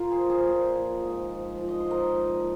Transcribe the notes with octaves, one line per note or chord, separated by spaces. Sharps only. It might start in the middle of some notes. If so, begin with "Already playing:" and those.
Already playing: F4 A#4
G#4 C5
F3
G#4 C5
A#2
F3
G#2
F3
F3
D#5
G#2 C5
A#4 D#5
A#2
F3